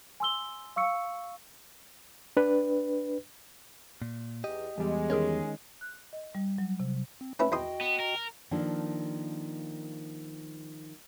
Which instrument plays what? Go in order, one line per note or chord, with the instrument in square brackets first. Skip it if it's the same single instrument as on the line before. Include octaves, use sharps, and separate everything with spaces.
[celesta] G#5 C6 E6 G7
F5 C#6 E6 C#7
[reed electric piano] D4 B4
[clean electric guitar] A#2
[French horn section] E2 [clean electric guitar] G4 D#5
[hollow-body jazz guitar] E2 G3 [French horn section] G#3
[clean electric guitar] D#3 C#4 [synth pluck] G#4 A#4 C#5
[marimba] F#6
D#5
G3
F#3
C3
[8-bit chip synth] C4
[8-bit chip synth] A3 C4 [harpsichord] C#4 E4 B4
[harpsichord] E2 C6 D#6 [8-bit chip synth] F#4 D#5 G5
[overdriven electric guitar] B3
A#4
[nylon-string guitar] D#3 F3 A#3 D4 A4